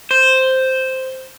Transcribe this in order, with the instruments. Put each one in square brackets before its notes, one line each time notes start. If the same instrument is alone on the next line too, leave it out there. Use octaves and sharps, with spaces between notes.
[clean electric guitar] C5